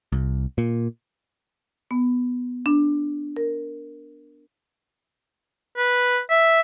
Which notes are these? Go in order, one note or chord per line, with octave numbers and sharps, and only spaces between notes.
C2
A#2
B3
D4
A#4
B4
E5